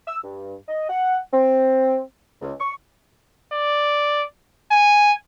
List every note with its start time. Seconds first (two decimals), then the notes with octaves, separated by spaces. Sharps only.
0.07 E6
0.23 G2
0.68 D#5
0.90 F#5
1.33 C4
2.41 C#2
2.60 C#6
3.52 D5
4.72 G#5